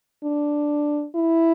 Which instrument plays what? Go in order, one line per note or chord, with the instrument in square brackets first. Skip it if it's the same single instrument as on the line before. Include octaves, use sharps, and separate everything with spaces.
[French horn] D4
E4